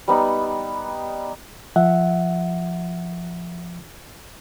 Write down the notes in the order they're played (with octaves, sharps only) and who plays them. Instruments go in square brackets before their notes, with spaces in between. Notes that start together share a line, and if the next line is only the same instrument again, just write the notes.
[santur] G3 B3 D#4
[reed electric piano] F3 E5 F#5